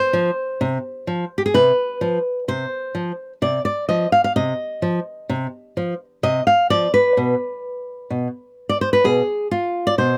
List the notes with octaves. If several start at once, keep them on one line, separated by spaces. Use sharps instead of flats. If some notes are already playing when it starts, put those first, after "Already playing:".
Already playing: C5
F3
C3
F3
G4
G#4
C3 B4
F3
C3 C5
F3
C3 D5
D5
F3 D#5
F5
F5
C3 D#5
F3
C3
F3
C3 D#5
F5
F3 D5
B4
B2
B2
D5
C5
B4
B2 G#4
F4
D5
B2 C5